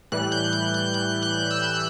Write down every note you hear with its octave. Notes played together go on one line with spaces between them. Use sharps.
A2 E3 G3 F#6
G6
G6
G6
G6
F#6
E6